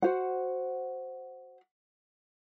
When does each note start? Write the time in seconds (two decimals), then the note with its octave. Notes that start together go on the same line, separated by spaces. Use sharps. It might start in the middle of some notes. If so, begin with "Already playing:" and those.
0.02 F#4 C5 F#5